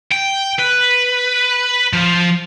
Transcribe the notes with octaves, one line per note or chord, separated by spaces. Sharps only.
G5
B4
F3